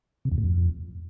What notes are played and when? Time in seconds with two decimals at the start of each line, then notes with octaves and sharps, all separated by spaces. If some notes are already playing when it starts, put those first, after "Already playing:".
0.25 C3
0.31 E2
0.38 A2
0.44 F2